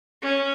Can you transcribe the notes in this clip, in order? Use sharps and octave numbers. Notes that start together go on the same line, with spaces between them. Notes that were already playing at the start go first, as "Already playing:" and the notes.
C#4